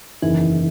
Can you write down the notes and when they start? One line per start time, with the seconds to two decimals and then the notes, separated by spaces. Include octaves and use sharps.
0.22 F#1 E2 D#3 E3